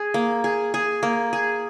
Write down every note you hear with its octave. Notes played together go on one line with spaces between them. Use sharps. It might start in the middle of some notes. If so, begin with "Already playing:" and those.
Already playing: G#4
A#3
G#4
G#4
A#3
G#4